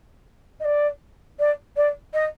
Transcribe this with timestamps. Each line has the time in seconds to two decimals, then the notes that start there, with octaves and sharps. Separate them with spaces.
0.60 D#5
0.65 D5
1.40 D5
1.77 D5
2.14 D#5